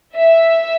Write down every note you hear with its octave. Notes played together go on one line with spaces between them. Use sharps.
E5